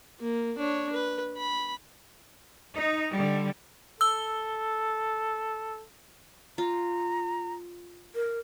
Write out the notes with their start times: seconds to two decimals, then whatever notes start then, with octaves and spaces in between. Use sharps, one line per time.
0.20 A#3
0.58 D4 C#5
0.92 B4
1.37 B5
2.75 D#4
3.12 D3 G3
4.01 A4 E6 G7
6.58 F4 A#5
8.15 A#4